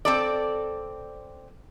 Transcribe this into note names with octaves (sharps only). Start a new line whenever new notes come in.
C4 A4 D5